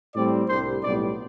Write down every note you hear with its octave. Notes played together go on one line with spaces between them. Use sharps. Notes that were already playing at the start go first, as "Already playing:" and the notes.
A2 G3 C4 D5
C2 C3 G3 D4 C5
B1 A2 G3 B3 D5